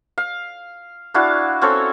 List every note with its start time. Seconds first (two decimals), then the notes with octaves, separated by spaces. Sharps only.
0.18 F5
1.14 D4 E4 F#4 F5
1.62 C4 C#4 A4 C#5